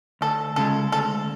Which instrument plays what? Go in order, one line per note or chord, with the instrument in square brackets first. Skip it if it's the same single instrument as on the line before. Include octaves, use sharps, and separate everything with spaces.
[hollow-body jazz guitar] D2 [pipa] A4
[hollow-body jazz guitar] C#3 G#3 [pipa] A4
[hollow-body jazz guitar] D2 [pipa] A4